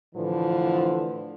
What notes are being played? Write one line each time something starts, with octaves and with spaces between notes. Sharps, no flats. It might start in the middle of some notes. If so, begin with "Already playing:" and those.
A2 D3 E3 F3